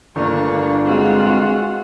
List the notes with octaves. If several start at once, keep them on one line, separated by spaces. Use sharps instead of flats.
G1 A2 G3 A#3 D4 C#6
G#3 C4 F4 F#4